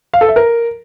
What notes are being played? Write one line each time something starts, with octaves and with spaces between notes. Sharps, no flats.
F5
A4
E5
A#4